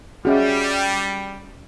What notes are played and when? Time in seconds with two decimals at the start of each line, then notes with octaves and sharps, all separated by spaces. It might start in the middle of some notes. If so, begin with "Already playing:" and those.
0.25 G3 C#4 F#4 G#4 D#5 E5